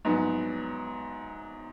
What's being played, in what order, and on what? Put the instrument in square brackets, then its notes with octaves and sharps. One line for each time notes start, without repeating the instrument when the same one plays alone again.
[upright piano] A#1 G#2 F#3 B3